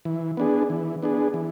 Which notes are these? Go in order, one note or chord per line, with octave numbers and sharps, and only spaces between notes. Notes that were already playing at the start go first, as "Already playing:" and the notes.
E3
B3 D4 G#4
E3
B3 D4 G#4
E3